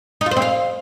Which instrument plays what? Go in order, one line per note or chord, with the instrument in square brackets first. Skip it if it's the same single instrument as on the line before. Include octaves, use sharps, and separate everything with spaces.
[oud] D#4
F4
C5
C4
F5